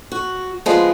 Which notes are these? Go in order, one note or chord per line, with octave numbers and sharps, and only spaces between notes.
F#4
F3 G#3 B3